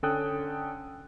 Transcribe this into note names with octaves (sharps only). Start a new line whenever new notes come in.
D3 C#4 A4 G5 D#6 F#6